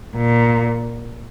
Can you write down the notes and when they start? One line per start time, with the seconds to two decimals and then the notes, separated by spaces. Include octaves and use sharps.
0.16 A#2